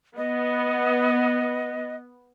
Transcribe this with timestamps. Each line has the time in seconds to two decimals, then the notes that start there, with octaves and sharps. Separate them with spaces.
0.17 B3 D#5